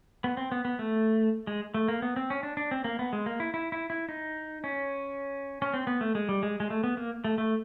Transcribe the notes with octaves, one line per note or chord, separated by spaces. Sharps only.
B3
C4
B3
B3
A3
G#3
A3
A#3
B3
C4
C#4
D4
D4
C4
A#3
B3
G#3
A#3
E4
E4
E4
E4
D#4
C#4
C#4
C4
B3
A3
G#3
G3
G#3
G#3
A3
B3
A#3
A3
A3